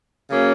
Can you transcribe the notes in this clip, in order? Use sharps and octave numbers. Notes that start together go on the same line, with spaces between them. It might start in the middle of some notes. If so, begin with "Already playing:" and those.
C#3 F#3 A#3 C#4